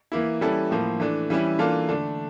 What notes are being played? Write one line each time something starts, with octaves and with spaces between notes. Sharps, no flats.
E3 A#3 E4
E3 G3 C#4 E4 A4
A2 F3 A#3
E3 A3 D4
E3 G3 C#4 E4
E3 A#3 D4 F4 A4
D3 A3 D4